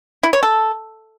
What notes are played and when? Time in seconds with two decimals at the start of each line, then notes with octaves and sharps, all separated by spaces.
0.23 E4
0.33 C#5
0.43 A4